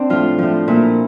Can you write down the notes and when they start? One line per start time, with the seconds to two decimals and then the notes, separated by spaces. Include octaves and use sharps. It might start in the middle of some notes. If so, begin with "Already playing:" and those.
Already playing: C4 D4
0.10 A2 F3 F4
0.39 A2 F3
0.68 A#2 F3 E4